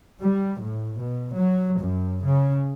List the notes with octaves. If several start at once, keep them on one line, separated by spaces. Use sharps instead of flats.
G3
A2
B2
F#3
F#2
C#3